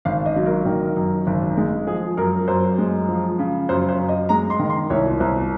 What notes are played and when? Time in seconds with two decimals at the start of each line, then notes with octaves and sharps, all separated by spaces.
0.05 G#1 F5
0.26 D#5
0.36 F#3
0.46 A#4
0.66 D#3
0.97 F#2
1.27 G#1
1.57 G#3
1.87 F3 G#4
2.17 F#2 A#4
2.48 F#2 C5
2.78 G#3
3.08 F3
3.39 C#3
3.69 F#2 C5
3.89 C5
3.99 F#2
4.09 D#5
4.29 G#3 A#5
4.50 C6
4.60 D#3
4.70 C6
4.90 C2 C#5
5.20 C2 C5